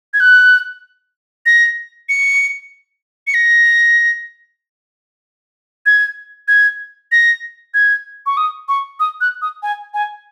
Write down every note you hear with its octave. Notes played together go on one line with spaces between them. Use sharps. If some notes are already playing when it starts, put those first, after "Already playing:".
G#6
F#6
A#6
C#7
C#7
A#6
G#6
G#6
A#6
G#6
C#6
D#6
C#6
D#6
F#6
D#6
G#5
G#5